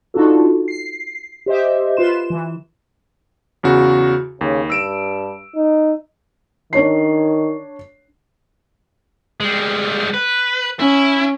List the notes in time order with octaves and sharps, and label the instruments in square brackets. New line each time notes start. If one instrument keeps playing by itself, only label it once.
[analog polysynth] D4 D#4 F4 F#4 A4
C7
G4 C5 D#5 E5
F4 B4 C6 E7
E3
[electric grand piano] E2 C#3 F#4
[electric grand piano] D#2 [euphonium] C#3
[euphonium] G2 [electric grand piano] E6 D7 E7
[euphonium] D#4
[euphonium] D#3 [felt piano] D4 C#5 C7
[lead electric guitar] G3 G#3
B4
[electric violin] C#4 [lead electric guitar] E4